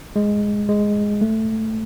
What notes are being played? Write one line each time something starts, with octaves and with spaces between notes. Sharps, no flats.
G#3
G#3
A3